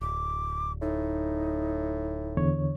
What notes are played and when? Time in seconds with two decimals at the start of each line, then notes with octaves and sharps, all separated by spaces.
0.01 D1 D6
0.82 A2 D#4
2.37 E2 D3 C#5